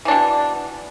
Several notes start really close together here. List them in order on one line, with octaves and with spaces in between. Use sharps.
E3 D4 B2